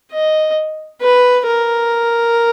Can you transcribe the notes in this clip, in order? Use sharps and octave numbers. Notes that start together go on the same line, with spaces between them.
D#5
B4
A#4